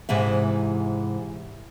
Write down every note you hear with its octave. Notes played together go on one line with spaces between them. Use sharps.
G#2 C3 E3 E5